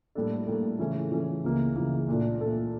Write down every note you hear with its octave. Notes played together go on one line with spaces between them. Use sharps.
A2 G3 A#3 D4 A4
A2 G3 A#3 D4 A4
C#3 E3 A3 C#4
C#3 E3 A3 C#4
C#2 C#3 E3 A#3
C#2 C#3 E3 A#3
A#2 A3 D4 A4
A#2 A3 D4 A4